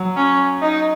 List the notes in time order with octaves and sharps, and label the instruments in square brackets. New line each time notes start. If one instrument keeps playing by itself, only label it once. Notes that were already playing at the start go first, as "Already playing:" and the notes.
Already playing: [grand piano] F#3
[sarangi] C#4
D#4